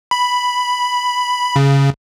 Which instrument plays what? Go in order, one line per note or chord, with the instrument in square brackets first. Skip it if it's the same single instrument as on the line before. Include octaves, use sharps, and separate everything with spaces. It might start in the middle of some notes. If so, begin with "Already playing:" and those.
[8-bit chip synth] B5
C#3